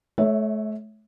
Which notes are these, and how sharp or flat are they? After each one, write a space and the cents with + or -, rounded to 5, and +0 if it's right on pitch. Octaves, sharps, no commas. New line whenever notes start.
A3 -35 C#5 +0 E5 +0